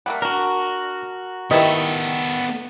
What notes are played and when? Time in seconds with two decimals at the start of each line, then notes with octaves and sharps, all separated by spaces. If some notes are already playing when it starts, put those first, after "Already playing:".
0.06 G3 A3 A#3 F#5
0.22 D4 F#4 A#4
1.51 D#3 B3 E4 G4 A4 B4 D5 D#5